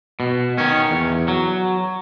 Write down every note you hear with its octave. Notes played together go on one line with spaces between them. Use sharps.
B2
D#3 C#4
E2
F#3